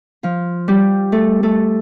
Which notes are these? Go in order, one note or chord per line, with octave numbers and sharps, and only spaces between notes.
F3 F4
G3 G4
A3 A4
A3 A4